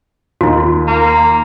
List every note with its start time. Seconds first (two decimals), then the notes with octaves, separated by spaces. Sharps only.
0.41 D#2 D#4 F4
0.88 A#3